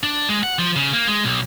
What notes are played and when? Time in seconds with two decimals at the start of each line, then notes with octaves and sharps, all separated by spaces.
0.03 D4
0.29 G#3
0.43 F#5
0.59 F3
0.76 C#3
0.93 A#3
1.07 G#3
1.25 B1